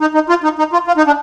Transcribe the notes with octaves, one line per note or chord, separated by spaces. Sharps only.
D#4
D#4
F4
D#4
D#4
F4
F4
D#4
D4